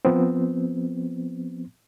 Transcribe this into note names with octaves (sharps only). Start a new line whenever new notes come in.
F3 B3 C4